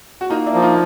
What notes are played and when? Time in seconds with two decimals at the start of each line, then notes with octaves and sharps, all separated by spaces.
0.21 F#4
0.30 A#3 D#4 F4
0.46 D4 E4
0.54 F3
0.62 D#4 F4